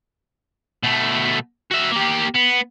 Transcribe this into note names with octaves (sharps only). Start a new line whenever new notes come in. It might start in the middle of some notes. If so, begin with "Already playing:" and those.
B2 A3
F#4 E5
A#3 G4
B3